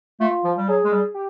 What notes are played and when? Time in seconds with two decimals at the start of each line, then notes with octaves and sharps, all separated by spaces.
0.20 A3 F4
0.44 F3
0.57 G3
0.68 F#3 G#4
0.84 G#3
0.92 G3
1.14 G4